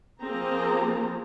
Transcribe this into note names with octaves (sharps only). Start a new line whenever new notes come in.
F3 A#3 C4 G#4 A#5